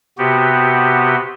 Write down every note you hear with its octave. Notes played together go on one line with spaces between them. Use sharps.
C3 B3 F#4 G4